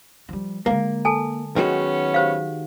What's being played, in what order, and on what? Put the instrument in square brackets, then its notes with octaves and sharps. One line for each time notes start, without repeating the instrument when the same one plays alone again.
[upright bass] F3 G3
[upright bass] D3 G#3 [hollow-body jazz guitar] A#3
[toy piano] A4 G#5 A5
[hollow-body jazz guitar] D#3 G#3 F#4 [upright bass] F#3 [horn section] B3 C#4
[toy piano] G4 C5 F5